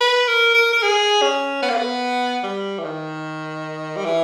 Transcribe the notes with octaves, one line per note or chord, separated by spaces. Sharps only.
B4
A#4
A#4
A#4
G#4
C#4
B3
A#3
B3
G3
E3
D#3
G3
E3